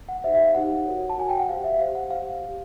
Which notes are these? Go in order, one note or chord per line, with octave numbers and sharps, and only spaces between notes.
F#5
D#4 G4 C5 E5
E5
F5
D#4 G4 C5 F#5
F#4 A#4 C#5
A5
F#4 A#4 C#5 G#5
G5
F#5
G4 C5 F5
E5
G4 C5 F5
F#5
G4 C5 F5
G4 C5